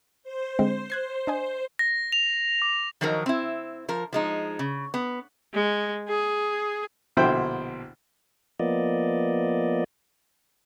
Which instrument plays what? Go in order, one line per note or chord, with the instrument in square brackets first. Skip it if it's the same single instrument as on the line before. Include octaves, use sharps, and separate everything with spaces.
[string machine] C5
[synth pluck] D3 G#3 C4
F#6 G#6 C7
D4 D#5 G#5
[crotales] A#6
F7
D6
[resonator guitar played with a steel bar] D#3 F3 F#3 D#4 A#4
C4 E4
F3 A#4
F3 G#3 D#4
C#3
B3
[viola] G#3
G#4
[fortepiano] A#1 B2 D3 E4 C5 G5
[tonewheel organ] F3 A#3 B3 D5 D#5